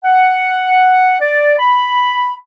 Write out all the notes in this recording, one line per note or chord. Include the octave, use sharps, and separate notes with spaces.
F#5
D5
B5